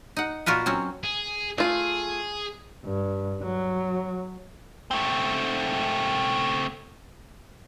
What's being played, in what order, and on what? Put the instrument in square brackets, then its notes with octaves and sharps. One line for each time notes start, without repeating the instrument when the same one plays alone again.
[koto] D#4 F#5
A#2 F4 F#4 A#4 B4
F#3 C4 C#4
[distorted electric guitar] G#4
[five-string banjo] A3 F4 [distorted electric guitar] G#4
[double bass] G2
F#3
[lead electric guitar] A3 C4